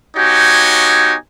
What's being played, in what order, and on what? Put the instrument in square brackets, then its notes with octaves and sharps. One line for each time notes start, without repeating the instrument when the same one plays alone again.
[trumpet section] B3 D#4 F#4 G4 C#5 G#5